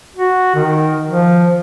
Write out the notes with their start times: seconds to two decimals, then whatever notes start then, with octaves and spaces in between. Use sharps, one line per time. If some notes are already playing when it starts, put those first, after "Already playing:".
0.17 F#4
0.55 D#3
1.10 F3